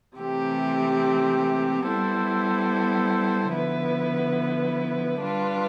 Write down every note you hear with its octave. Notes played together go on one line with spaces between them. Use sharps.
C3 E3 A3 C4 G4
G3 B3 E4 A4 C5
D3 F3 B3 E4 B4
G3 D4 F4 B4